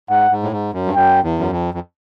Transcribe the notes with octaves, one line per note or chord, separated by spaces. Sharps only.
G#2 F#5
G#2
A2
G#2
F#2
G2
F#2 G5
E2
F#2
F2
F2